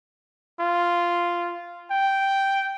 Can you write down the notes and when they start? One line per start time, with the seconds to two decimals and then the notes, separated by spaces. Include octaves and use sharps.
0.60 F4
1.91 G5